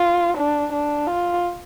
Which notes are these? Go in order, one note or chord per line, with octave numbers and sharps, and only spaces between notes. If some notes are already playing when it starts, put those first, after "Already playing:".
Already playing: F4
D4
D4
F4